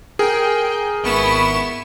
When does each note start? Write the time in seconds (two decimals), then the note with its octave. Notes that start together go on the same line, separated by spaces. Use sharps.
0.19 G#4 A#4 G5
1.03 G#1 B3 E4 C#6 E7